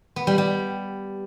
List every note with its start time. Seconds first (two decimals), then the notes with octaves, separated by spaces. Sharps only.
0.16 B3
0.27 G3
0.38 G3